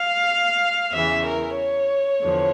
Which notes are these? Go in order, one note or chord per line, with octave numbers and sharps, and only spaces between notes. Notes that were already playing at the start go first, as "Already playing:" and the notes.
Already playing: F5
E2 C#3 E3 E5
A#4
C#5
E2 D3 F3